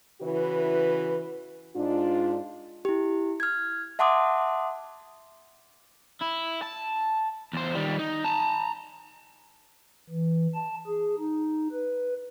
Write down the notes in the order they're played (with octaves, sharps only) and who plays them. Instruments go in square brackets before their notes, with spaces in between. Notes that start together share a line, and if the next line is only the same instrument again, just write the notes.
[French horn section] C#3 E3 E4 F#4 B4
G#2 D4 F4
[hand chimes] E4 G4
F6 G#6
E5 F#5 A5 C6 D6 D#6
[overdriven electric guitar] E4
A5
E2 C5
D#3 G3
D#4
A5 A#5
[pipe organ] E3
A5
G#4
D#4
B4